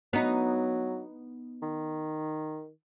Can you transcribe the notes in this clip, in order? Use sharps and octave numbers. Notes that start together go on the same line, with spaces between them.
F#3 B3 D#4
D#3